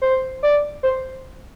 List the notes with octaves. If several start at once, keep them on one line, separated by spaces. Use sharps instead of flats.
C5
D5
C5